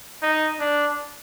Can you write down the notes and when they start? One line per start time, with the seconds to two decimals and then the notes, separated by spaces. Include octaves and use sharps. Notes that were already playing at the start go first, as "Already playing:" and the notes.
0.22 D#4
0.60 D4